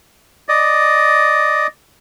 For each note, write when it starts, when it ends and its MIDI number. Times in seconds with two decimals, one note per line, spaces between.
0.49 1.67 74
0.49 1.67 75